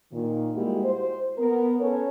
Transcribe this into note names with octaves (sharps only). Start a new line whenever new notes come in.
A#2 D#3
G3 G#3 A#3 E4 F#4 G4
C5
B3 A#4
C#4 A4 B4 C#5